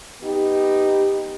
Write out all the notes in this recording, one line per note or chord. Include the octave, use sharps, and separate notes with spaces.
B3 D#4 G4